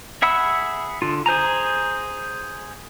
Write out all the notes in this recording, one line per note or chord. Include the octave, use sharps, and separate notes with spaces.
G#4 E5 F#5 B5 E6
D3 F4
G#4 C5 G#5 A#5